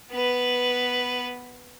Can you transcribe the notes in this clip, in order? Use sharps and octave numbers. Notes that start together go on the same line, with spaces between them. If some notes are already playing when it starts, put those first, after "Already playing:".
B3 B4